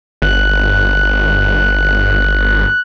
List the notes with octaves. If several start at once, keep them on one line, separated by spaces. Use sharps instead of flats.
G1 F#6